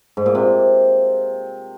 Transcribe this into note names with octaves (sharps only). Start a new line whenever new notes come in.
G#2
A#2
C3